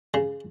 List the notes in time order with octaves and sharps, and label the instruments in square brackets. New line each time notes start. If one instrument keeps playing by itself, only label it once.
[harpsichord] C#3